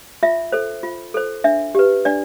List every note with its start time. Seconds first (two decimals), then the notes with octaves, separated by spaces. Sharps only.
0.23 F4 E5
0.52 A4 C5
0.83 F4
1.14 A4 C5
1.44 D4 E5
1.75 G4 B4
2.05 D4 D5